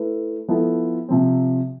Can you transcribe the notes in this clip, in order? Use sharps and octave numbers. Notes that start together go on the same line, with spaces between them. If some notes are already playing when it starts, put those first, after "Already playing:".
Already playing: A3 E4 B4
F3 B3 E4 A4
C3 F3 C4